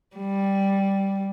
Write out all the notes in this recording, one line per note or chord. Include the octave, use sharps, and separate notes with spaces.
G3